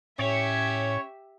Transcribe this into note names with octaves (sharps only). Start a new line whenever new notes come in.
A2 C#4 G4 C#5 E5